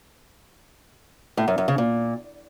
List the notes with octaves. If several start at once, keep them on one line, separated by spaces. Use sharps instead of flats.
A2
F#2
F#2
C#3
A#2